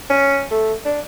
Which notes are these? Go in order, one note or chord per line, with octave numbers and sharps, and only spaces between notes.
C#4
A3
D4